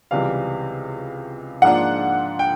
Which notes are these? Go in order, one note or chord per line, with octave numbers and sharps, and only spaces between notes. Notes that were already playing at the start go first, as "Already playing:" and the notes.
C#2 C3 E3 G3 F5
G#2 F3 A#3 D4 F4 F#5
G5